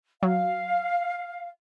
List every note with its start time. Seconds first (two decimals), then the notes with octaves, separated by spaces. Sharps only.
0.23 F#3 F5